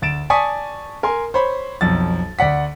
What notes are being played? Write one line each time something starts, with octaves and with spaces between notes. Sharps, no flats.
D2 A6 D7 E7
D5 G#5 A5 C#6 D#6 B6
A#4 G#5 C6
C5 C#5 B5
B1 F2 A6
D2 D5 F#5 B6